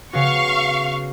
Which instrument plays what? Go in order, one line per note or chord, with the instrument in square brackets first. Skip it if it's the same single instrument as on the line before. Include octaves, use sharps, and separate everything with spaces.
[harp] C#3 B3 F#4 [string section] F5 C#6